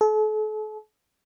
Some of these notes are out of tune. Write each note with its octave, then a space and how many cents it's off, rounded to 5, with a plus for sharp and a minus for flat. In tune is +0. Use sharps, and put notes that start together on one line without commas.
A4 -40